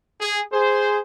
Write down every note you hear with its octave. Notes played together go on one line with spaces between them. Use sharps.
G#4
G#4 C5